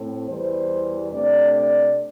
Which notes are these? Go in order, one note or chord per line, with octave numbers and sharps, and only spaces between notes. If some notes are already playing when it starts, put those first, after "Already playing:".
Already playing: A2 A3 C4
E2 E3 G3 C5
C3 A3 D4 D5
D5